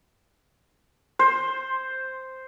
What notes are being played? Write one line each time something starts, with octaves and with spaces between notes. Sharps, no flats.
C5